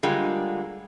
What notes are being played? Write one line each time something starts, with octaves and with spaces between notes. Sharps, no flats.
D3 G3 G#3 A#3 F4 G#4